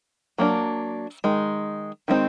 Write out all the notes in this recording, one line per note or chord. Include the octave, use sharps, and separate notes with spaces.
F#3 A#3 D4
D#3 G#3
D#3 G#3 C4 D#4